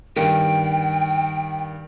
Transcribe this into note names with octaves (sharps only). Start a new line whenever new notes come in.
G2 D#3 G5